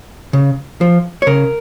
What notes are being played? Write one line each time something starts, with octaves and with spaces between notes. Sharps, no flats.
C#3
F3
C#5
C#3 A#4